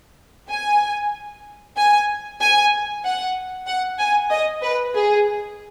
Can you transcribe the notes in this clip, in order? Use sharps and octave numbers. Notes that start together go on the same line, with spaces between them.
G#5
G#5
G#5
F#5
F#5
G#5
D#5
B4
G#4